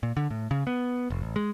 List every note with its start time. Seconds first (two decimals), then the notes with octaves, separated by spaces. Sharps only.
0.03 A#2
0.17 D3
0.30 A2
0.51 C#3
0.67 B3
1.10 F1
1.22 A1
1.36 G#3